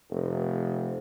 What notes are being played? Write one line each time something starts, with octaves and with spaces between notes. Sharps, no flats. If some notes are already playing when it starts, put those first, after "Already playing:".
F1